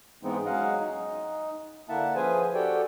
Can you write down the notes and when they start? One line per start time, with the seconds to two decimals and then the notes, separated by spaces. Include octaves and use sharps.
0.23 G#2 E3 G#3 B3 C4 D#4
0.46 F#3 G#3 C#4 D#5 F5 F#5
0.80 D#4
1.89 D3 A#3 E4 E5 F#5 A5
2.15 F3 C#4 G#4 B4 C5 G#5
2.55 F#4 G4 A4 D5 G5